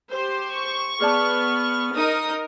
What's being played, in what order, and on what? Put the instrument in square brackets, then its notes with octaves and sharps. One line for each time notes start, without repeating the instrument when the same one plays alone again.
[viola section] G4 C5
[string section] C#6
[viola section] B3 [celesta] G#4 D5 A5 [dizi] F6
[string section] D#4 D#6 [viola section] A#4